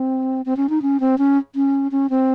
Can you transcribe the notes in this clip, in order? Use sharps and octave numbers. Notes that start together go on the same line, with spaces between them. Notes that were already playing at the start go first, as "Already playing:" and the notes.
Already playing: C4
C4
C#4
D#4
C#4
C4
C#4
C#4
C#4
C4